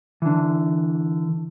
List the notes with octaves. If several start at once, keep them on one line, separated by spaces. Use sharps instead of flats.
D3 E3